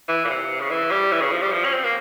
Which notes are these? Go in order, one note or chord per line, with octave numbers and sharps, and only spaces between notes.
E3
A#2
C3
C#3
E3
G3
E3
C#3
F3
G3
F3
C#4
C4
A#3